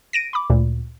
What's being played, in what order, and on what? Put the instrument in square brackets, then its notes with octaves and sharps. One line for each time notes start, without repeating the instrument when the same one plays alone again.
[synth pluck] A#6 D7 D#7
B5 D6
D2 A#2